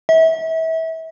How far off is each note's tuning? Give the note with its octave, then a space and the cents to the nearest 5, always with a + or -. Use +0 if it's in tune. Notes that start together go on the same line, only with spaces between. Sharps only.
E5 -30